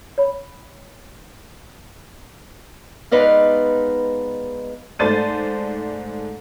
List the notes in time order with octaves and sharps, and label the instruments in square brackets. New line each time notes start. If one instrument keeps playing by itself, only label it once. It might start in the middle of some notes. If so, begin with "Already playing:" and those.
[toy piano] C#5 B5
[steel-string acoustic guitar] G#3 B3 D#4 B4 D5 F5
[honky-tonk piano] G#2 A3 C5 D5 A6 D#7